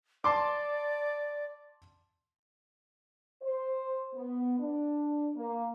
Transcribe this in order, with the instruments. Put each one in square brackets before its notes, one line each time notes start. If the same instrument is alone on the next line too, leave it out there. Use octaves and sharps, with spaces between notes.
[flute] D5 [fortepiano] A5 C6 D6
[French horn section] C5
B3
D4
A#3